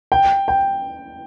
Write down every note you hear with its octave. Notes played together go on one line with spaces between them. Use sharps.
G5
G5